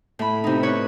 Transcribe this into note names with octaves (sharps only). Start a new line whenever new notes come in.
A2 B5
C3 D#4
B4 C#5